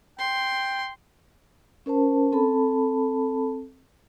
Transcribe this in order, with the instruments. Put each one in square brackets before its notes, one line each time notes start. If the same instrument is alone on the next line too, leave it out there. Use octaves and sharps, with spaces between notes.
[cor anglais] G5 [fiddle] C6
[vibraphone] C#4 A#4 C5 A5
C4 A4 A5 B5